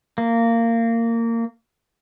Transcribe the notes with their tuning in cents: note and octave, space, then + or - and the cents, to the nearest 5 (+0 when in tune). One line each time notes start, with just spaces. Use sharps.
A#3 -20